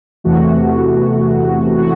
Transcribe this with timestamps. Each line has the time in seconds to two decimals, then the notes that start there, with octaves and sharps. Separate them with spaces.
0.24 E2 C3 E3 A3 F#4
1.78 F#4